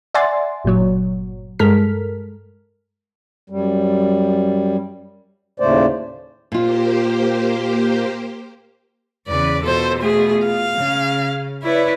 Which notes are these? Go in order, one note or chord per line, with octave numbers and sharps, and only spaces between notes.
D5 E5 F#5 G#5 C6 A6
G1 A#2 F#3 C#5
G2 G#3 A4 A#4 F6 B6
F#2 G3
D#2 A2 C#3 A3 C5 D5
A#2 A#3 F4 G4 C5
E2 C#3 B4 D5
B2 F4 A4 C5
A3 G#4
F5
C#3
E4 B4 C#5 D5